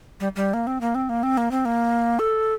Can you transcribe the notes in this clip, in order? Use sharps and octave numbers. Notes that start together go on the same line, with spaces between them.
G3
G3
A#3
C4
A#3
C4
A#3
C4
A#3
C4
A#3
A4